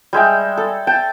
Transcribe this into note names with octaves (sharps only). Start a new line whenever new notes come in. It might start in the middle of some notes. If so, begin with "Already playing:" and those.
G3 G#3 E5 G5
A4
G5 A5